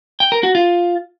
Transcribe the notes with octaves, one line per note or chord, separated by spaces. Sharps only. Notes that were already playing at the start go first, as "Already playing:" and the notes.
G5
A#4
F#4
F4